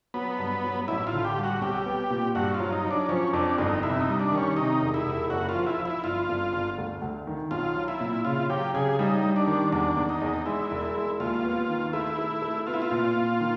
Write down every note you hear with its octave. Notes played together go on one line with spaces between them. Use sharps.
F#3 B3
G2
F#3
A1 E4
F4
D3
G4
G3
F#4
B1 G4
B3
A#2
G2 F#4
F4
F#3
D#4
F#3
D4
F3 C#4
F2 D4
G1 D#4
C3 E4
D#4
G3
D4
D#3
C#4
C3 D#4
E1
E4
E1
F#1 F#4
F4
F3
E4
F3
E4
G1 F4
G1
G1
D2
D2
D#3
B1 F4
F#3
E4
A#2
C#3 F4
F#3 G4
C#3 G#4
G3 D#4
G3
D4
D#3
E2 D4
E2
D#4
E2
G#3 E4
E1
G#3
D#2 F4
B3
D#3
A3 E4
A3
A3
B3 F4
E4
F4
A#2
A#2
D#3